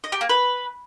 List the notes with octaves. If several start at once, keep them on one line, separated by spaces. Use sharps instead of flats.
D#5
G4
A#3
B4